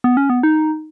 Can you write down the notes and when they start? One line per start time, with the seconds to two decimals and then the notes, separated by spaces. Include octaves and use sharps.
0.04 B3
0.17 C#4
0.30 B3
0.43 D#4